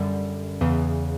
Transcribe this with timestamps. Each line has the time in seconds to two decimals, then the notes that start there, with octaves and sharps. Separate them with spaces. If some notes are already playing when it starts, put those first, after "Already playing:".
Already playing: F#2 D3 G3
0.61 E2 C#3 E3